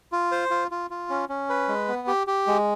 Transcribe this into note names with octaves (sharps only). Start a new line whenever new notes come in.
F4
C5
F4
F4
F4
C#4
C#4
B4
G#3
B3
G4
G4
G#3